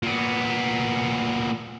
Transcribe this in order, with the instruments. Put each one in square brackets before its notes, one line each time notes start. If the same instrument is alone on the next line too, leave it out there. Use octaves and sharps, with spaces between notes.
[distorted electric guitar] A#2 B3